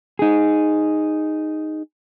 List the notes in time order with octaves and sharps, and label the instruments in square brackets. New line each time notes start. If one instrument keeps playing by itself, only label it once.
[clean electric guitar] D#4 G#4